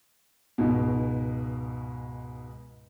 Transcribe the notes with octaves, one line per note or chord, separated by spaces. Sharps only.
C#2 G#2 B2